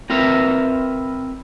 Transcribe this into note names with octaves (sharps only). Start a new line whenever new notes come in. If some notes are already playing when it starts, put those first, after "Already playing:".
C4 F4 A#4 B4 E5 A#5